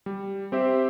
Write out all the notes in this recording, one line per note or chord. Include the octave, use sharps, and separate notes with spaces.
G3
C4 G4 C5 E5